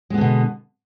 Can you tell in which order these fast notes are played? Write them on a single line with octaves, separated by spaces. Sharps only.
G#3 B3 D3 B2